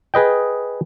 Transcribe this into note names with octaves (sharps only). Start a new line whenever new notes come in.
G#4 B4 D#5 G5